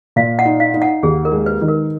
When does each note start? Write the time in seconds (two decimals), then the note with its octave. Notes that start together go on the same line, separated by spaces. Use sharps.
0.16 A#2 F5
0.39 F#5
0.45 D#4
0.60 F5
0.74 D#4
0.82 F#5
1.03 D#2 G#4
1.25 A#4
1.32 G#3
1.46 B4
1.61 D#3
1.68 A#4